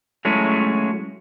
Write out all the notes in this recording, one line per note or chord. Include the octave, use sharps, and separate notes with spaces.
F#3 G#3 A3 C#4 E4